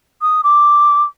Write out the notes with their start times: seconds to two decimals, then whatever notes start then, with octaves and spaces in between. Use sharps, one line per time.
0.22 D#6
0.44 D6